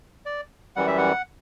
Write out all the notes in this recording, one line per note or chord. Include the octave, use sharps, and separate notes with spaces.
D5
F#2 E3 G3 F#5
E5
F#5